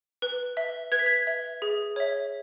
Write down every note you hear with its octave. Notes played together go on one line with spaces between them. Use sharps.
B4
E5
B4 G#6
B6
G#6
E5
G#4
C#5 E5